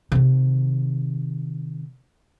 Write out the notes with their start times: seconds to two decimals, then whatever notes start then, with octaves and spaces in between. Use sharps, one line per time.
0.12 C3 D#3